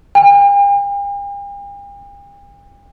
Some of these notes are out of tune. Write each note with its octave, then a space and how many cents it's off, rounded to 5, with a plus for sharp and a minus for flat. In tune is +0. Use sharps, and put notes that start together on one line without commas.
G5 +45